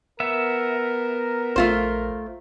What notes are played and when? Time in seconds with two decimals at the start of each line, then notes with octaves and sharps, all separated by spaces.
0.20 B3 A#4 E5
1.56 A#1 A3 F4 C5